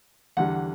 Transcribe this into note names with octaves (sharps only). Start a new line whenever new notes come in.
E2 D3 G3 F#5